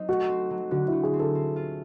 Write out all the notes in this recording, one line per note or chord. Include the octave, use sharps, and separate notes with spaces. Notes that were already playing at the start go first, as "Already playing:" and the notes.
Already playing: F#3 C4 D#4
A3 F#4
C4
F#3
D3 F#4
A3 E4
G#4
C4
A4
C4
F4